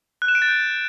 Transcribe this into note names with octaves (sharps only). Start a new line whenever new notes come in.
F#6
E7
D7
A6
G6